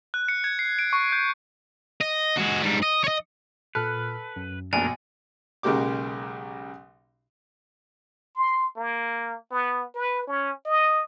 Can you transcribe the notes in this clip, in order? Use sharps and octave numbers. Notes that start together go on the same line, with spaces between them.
F#6
C#7
G#6
C7
D7
C#6
G6
D#5
G#3 F#4
G#2 G3
D#5
C#5 D#5
A#2 A4 B4 F6 F#6
F#2
A#1 B2 A3 D4 A#4 G#5
B1 C#3 G#3 A#3 G4 D6
C6
A#3
B3
B4
C#4
D#5